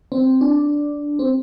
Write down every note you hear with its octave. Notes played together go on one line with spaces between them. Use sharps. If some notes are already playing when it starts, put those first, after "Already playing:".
C4
D4
C4